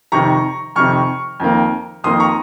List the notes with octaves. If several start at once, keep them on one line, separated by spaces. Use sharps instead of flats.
F2 C3 D#3 A#5 C#6
F2 C3 D#3 C#6 F6
F2 D#3 A#3
F2 D#3 A#3 C6 D#6
A#5 C#6